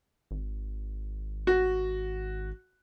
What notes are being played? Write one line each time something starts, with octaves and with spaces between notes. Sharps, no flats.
G#1
F#4